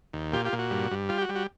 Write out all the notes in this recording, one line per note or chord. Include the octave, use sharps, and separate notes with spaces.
D#2
A#2 F4 G4
F4 G4
A#2
F#4
G2
G2
G3 F4
G4
F#4
G3
F#4